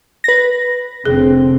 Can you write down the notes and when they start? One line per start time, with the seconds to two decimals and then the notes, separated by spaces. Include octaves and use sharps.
0.24 B4 A#6
1.05 F1 D3 C4 G#4